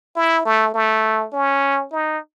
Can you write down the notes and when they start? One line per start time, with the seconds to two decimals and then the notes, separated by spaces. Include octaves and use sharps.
0.16 E4
0.46 A3
0.74 A3
1.33 C#4
1.92 D#4